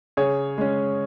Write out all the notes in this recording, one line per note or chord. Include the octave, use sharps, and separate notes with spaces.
C#3 G#4 C#5
G#3 C#4